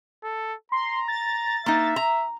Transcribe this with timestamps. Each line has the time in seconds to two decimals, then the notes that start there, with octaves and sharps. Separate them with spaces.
0.24 A4
0.72 A#5 C6
1.08 A6
1.66 A#3 D#4 E5
1.96 A#5